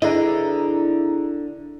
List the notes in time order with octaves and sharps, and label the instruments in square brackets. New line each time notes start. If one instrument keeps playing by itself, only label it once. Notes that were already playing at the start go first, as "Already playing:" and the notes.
[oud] D3 [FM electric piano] E4 D5 A#5 [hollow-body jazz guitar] G#4 B4 D#5